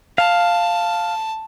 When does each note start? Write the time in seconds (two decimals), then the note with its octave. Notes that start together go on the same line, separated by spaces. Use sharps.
0.18 F5 A5